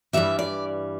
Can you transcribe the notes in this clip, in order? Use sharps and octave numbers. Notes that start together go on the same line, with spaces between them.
G2 E3 G3 E5
D5